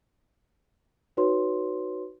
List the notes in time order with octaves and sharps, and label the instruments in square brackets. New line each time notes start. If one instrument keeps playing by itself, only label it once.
[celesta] D#4 F#4 B4 C#5 C6